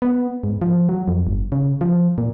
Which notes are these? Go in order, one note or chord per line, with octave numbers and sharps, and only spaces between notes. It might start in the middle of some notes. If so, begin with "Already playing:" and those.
B3
G#2
F3
F#3
F2
G1
C#3
F3
A#2